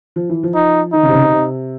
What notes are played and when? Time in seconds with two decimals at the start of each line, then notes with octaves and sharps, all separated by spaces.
0.16 F3
0.30 E3
0.43 F3
0.55 D#4
0.93 D#3 D#4
1.03 C#3
1.08 C3
1.13 C#3
1.22 C3
1.33 C3